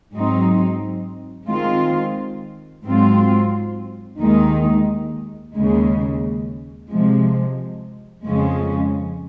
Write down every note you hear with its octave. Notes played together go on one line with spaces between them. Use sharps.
G#2 F#3 C4 D#4
D#3 G#3 C4 F4
G#2 F#3 C4 F4
D#2 D#3 G#3 D#4
D#2 C#3 G#3
C3 F3 G#3
F2 C#3 F3 G#3 C#4